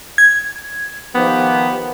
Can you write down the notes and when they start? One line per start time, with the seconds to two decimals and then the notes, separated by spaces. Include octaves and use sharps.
0.18 G#6
1.15 D#3 F3 B3 G4